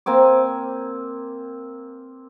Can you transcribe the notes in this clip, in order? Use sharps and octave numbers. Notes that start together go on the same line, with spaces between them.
A#3 C4 G#5 D6